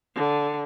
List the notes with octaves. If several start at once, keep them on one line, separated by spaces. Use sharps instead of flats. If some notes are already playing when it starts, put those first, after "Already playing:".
D3